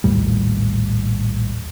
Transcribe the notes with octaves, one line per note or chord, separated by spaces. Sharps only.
A#1 D#2 A2 G3